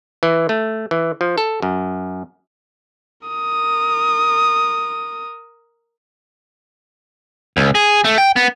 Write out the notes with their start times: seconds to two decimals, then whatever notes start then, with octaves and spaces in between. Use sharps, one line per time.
0.23 E3
0.49 A3
0.91 E3
1.21 F3
1.38 A4
1.62 F#2
3.27 A#4 D#6
7.57 C#2
7.75 G#4
8.04 A3
8.18 G5
8.36 B3